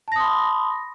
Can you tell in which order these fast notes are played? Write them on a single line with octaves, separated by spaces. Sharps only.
A5 A#6 D#6 C6 B5